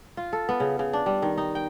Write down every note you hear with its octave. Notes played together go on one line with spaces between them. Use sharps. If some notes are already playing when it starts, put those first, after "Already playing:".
F4
A4
B3
C#3
C#3
D4
G3
D#3
D#4
G5